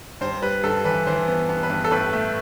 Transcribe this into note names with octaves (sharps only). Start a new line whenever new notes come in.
G2 C5
G3 B4
G2 A4
E3 B4
E3 C5
B3
B3
B4
G2
A4
A2 B4
A3